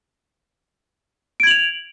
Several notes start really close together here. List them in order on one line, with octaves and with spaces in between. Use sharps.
D7 G#6 F#7 F7